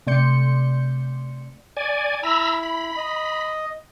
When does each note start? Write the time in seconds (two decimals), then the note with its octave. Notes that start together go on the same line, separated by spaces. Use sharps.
0.07 C3 A3 D5 C6 G6 C#7
1.77 D5 G#5
2.23 E4 A#5 B5 E6
2.63 B5
2.97 D#5